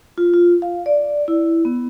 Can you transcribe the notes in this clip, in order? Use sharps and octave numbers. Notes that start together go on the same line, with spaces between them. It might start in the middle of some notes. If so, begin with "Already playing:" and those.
F4
F4
F5
D5
E4
B3